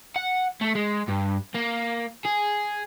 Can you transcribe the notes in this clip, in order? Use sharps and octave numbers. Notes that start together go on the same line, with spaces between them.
F#5
A3
G#3
G2
A#3
G#4